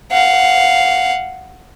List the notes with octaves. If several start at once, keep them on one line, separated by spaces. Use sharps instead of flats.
F5 F#5